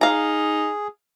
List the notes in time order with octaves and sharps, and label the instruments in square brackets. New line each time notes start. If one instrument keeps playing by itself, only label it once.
[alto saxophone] D#4 [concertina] G#4 [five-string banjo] F5 A#5